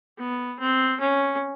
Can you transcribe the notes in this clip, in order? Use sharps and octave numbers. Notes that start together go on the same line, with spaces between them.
B3
C4
C#4